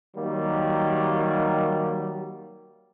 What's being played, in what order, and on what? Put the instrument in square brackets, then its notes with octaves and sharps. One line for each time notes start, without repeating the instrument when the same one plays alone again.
[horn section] D#3 F#3 G3 A#3